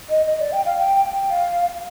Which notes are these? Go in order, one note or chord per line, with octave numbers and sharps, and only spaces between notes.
D#5
D#5
D5
G5
F5
G5
F5